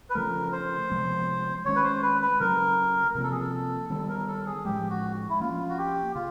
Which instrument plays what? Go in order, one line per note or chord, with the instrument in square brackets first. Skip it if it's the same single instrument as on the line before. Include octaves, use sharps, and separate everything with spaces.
[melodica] B4
[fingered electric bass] C#3 F3 A3 [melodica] A#4
[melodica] C5
[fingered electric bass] C3 F3 G#3 B3
[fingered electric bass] D#3 G#3 C#4 [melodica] C#5
[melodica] B4
C5
B4
B4
[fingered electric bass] C#3 F#3 A3 [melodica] A#4
[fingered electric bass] C3 F3 A#3 [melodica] A#4
[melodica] A4
G#4
A4
[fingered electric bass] D#3 G3 B3 [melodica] A4
[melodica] A#4
A4
G#4
[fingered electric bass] A2 F3 G#3 [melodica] G4
[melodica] F#4
E4
[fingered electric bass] F3 A#3 C#4 [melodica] F4
[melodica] F#4
G4
[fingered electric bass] C#3 [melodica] F4